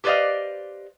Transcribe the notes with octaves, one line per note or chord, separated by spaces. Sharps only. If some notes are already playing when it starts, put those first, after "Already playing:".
G4 B4 C5 D5 D#5 F5